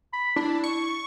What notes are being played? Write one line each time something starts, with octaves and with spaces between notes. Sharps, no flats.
B5
D4 E4
C#6